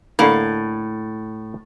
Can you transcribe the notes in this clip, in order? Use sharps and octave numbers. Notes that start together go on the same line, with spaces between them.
A2 D3 A#3